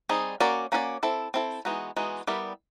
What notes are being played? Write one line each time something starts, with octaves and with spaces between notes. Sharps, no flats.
G3 C4 D#4 G#4
A#3 C#4 F#4 A#4 D5
A#3 C#4 F#4 A#4 D5
C4 E4 A4
C4 E4 A4
E3 G#3 B3 D#4 F#4
E3 G#3 B3 D#4 F#4
G3 B3 E4 G4 A#4